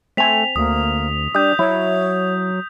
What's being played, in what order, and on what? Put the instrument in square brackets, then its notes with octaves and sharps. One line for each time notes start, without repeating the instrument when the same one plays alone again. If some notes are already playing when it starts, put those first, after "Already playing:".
[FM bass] A3 [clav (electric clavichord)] C4 G#5 [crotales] B6 F7
[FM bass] D2 [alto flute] A#3 [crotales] D#6
[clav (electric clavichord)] G3 [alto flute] D4 [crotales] D#6 G6
[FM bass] F#3 [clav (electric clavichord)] E4 [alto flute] C#5